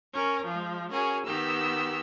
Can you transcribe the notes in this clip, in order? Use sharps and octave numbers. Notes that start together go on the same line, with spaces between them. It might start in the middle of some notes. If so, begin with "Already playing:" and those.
C#4 A#4
F3 G#3
C#4 F#4 G#4 A#4
D#3 B3 G4 E6